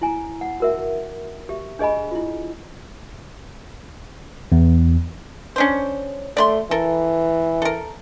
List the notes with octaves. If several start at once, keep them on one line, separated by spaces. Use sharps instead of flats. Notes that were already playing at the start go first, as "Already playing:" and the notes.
E4 G#5 A#5
F#5
F#4 A#4 E5
G4 E5
D4 G#4 D#5 G#5 B5
E4 F4
E2
C#4 D4 C5
A3 D5 B5 C6
E3 A4 A#4
A4 A#4